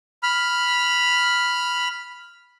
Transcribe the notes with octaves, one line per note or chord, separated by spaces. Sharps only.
B5 F6